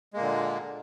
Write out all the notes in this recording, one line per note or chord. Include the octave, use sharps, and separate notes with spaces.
A#2 D3 G#3 A#3